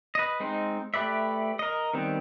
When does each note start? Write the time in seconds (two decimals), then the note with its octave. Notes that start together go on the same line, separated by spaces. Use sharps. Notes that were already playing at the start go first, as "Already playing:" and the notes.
0.15 B4 D#5
0.40 G#3 C4 D#4
0.94 A3 G4 B4 D5 E5
1.59 A#4 D#5
1.94 D#3 G3 B3 C4